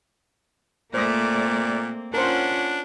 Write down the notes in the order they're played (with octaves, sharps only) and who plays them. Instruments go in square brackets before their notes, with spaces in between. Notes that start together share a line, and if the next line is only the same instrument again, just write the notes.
[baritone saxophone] A#2 [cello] A3 D5 [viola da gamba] A#3 C4 [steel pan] C5 D#6
[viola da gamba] C#4 F4 [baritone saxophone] D4 [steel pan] A#4 C5 [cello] F#5